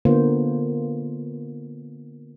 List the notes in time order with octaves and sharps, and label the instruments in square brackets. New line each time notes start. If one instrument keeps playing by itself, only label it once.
[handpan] D3 A#3 B3 F4 C5